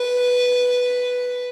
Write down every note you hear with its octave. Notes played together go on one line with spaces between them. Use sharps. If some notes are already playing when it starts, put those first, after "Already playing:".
Already playing: B4